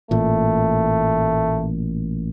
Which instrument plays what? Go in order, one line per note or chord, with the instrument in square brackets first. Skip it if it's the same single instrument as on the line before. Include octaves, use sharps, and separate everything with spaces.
[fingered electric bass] A1 A#2 [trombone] A3